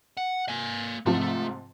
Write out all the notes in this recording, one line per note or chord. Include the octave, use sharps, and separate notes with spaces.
F#5
A#3 G#5
G#2 C3 F3 A3